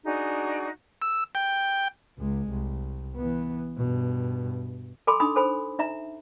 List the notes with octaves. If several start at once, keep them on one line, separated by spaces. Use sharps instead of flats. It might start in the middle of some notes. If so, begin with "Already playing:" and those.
D4 D#4 F#4 G#4
E6
G5
C#2 G#3
C2
E3 B3
G2 B2
A4 G#5 B5 C6 D6
D4 D#4 B5 D#6
A4 C5 G#5 B5
D#4 E5 A#5